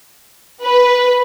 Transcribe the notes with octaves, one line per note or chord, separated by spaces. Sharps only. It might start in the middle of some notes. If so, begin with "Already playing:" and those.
B4